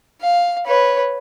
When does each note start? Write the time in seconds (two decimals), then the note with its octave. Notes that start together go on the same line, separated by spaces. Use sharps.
0.21 F5
0.66 B4 C#5